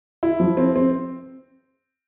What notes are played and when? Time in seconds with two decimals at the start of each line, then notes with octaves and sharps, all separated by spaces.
0.23 E4
0.40 F3
0.57 C4
0.76 C4